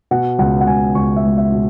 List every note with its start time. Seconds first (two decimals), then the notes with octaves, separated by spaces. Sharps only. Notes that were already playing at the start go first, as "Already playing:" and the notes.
0.11 B2 F#5
0.39 C#2 F#5
0.61 F#5
0.67 C#2 G#5
0.95 C#2 C#6
1.17 E5
1.24 G#3
1.38 E5
1.52 B2